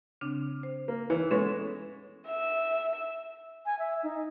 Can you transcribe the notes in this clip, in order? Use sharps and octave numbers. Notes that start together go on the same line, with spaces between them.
C#3 C4 D4
C5
A#3
E3 C#5
G#3 B3 C#4 A4 B4 C#5
E5
G#5
E5
D#4